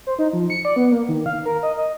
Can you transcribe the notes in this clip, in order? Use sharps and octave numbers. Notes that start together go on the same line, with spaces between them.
C5
D#4
F3
C#7
D5
B3
A#3
D#3
F5
A#4
D#5
D#5